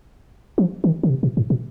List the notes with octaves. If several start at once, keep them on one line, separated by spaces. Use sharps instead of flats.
F3
D#3
D3
C3
A#2
G#2
A#2